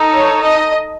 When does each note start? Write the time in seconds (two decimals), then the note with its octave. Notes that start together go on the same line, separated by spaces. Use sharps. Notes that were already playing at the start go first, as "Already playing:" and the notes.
Already playing: D#4 A4
0.13 C#5
0.43 D#5